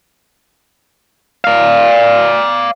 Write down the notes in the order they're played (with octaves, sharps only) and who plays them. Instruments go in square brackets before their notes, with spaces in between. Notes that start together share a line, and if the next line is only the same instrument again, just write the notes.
[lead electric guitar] D5 F5